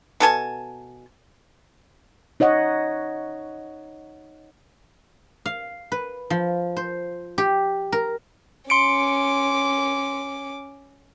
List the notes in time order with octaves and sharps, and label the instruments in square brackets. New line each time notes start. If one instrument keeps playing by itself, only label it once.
[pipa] B2 A4 G#5 A5
[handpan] D#4 C#5 D#5 F#5
[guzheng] F5
B4
F3
C5
G4
A#4
[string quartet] C#4 D6 [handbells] C6 C#7 D7